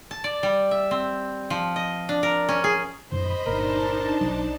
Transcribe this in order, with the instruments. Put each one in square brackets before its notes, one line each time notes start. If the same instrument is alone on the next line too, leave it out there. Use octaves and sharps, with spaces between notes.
[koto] A5
D5
G3
E5
C4
F3
D#5
D4
A#4
C#4
G#4
[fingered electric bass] F#2 A#2 D#3 [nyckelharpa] C5 [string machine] D#5 B5
[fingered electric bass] G1 A#2 [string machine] D4 D#4 A5 [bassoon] A#4
[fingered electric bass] B1 F#3